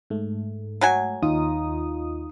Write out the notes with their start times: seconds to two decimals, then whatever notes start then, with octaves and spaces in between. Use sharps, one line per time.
0.10 G#2 A3
0.81 F#3 F#4 G#5
1.23 D#2 D#4 F4 D#6